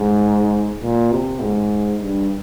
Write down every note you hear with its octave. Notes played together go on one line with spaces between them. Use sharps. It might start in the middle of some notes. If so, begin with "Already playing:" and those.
Already playing: G#2
A#2
C3
G#2
G2